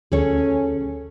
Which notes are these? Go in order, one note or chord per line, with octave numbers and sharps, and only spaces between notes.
D2 C#4 G#4 A4 C#5